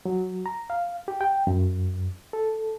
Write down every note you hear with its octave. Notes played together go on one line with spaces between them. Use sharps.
F#3
A#5
F5
G4
G5
F#2
A4